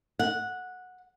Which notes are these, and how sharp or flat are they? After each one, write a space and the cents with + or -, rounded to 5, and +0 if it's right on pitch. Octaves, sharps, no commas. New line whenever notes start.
F#5 -10